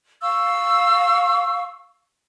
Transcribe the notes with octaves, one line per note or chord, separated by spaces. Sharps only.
F5 C#6 E6